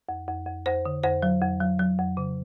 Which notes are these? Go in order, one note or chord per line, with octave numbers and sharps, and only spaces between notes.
F2
F2
F2
F2 C5
D3
F2 C5
F#3
F2
F#3
F#3
F2
C#3